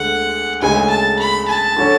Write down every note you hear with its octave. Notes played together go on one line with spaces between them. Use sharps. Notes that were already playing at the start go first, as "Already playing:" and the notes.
Already playing: D2 D3 G#3 F#5
D2 C#3 G#3 G#5
A5
B5
A5
D3 F#3 C#4